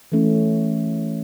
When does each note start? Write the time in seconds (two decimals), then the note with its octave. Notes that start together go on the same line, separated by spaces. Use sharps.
0.12 E3 A3 C#4